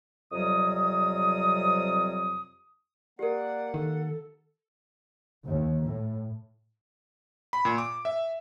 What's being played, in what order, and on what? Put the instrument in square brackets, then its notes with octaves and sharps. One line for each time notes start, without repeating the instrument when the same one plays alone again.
[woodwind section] F2 C3 F#3 G3 D#6
[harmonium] A#3 F#5 [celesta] G4 A#4 [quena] D5
[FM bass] D#3 [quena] A4
[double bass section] D#2
A2
[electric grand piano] B5
A#2
D6
E5